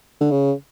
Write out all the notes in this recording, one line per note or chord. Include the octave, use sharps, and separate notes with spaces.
D3
C#3